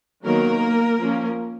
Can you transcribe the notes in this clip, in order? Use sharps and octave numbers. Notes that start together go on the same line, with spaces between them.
D#3 F#3 A#3 B3 A#4
F3 A#3 C#4